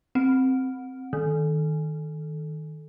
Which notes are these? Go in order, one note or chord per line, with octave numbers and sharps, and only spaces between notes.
C4
D#3